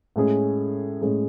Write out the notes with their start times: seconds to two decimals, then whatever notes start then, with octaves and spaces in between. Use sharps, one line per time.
0.16 A2 G#3 C#4 G#4
1.01 A2 G#3 C#4 G#4